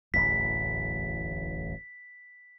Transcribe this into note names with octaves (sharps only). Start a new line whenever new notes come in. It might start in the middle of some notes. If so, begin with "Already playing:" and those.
D1 A1 E2 B6